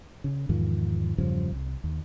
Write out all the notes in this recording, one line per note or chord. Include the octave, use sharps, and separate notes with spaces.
C#3
E2 G#2 D#3 F3
E2 G2 C#3 F3
C2
D#2